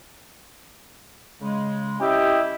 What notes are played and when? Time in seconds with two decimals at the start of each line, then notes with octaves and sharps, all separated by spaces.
1.41 C#3 G#3
2.00 C#4 E4 G4 D#5 G5